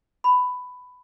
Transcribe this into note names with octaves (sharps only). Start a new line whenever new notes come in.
B5